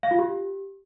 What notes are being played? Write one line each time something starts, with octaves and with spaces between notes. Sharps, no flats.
F5
F4
G4